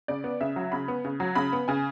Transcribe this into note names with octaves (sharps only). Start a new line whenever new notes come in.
C#3 D5
B3
C#3 E5
F#3
C#3 B5
B3
C#3
F#3
C#3 B5
B3
C#3 G#5